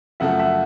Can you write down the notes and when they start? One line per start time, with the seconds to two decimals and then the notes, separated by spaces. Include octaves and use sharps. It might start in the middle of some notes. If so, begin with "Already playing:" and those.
0.20 F#2 C#3 F3 A3 E5 F#5
0.39 E5 F#5